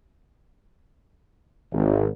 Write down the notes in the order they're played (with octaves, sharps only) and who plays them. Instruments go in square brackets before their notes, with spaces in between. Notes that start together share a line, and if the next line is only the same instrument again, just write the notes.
[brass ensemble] G#1